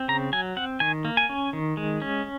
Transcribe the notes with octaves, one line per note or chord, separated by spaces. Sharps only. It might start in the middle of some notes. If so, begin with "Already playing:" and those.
Already playing: C4
C#3 A#5
F#3 G#5
C4 F#5
D#3 G#5
A#3
G#5
C#4
D#3
G#3
C#4